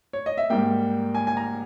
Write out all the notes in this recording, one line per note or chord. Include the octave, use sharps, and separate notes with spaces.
C#5
D#5
E5
G#2 G3 A#3 G5
G#5
G#5
A#5